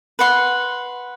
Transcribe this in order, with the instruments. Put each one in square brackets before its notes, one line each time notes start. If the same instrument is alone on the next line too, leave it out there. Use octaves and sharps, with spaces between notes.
[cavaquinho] B4 F#5 C6